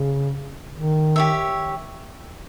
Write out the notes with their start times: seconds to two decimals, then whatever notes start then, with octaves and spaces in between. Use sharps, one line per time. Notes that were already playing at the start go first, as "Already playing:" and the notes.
Already playing: C#3
0.75 D#3
1.16 G4 C#5 E5